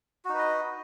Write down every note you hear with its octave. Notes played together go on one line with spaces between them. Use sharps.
D#4 F#4 B4 D#5